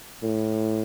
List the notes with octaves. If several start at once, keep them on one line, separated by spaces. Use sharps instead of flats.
A2